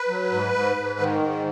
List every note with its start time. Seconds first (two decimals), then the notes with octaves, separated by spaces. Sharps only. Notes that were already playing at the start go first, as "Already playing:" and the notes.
Already playing: B4
0.08 F#3
0.31 G#2
0.54 G#2
0.77 G#2
1.00 D#3
1.22 G#2